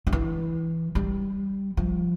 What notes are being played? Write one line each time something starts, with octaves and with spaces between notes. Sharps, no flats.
F3
E3
G3
F3